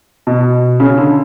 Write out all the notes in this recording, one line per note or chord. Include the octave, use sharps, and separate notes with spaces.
B2
C#3
D3